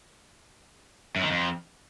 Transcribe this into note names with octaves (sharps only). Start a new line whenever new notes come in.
F#2
D#3
F2